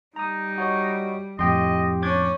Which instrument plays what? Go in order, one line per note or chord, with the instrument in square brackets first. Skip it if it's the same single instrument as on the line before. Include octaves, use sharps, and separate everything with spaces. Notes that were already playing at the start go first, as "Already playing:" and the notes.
[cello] G3 [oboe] D#4 [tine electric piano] A#5 D#6
[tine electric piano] F#4 C#5 D#5
[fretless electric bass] F2 A2 [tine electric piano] G4 G5 C6 [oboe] D#5
[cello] C#4 [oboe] D4 [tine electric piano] D6 G6 G#6